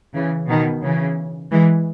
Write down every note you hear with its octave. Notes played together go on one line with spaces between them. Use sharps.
C#3 E3
B2 D#3
C#3 E3
E3 G#3